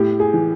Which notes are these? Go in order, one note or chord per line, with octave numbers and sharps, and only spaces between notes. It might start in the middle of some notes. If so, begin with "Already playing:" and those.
Already playing: A2 G4
G#4
E3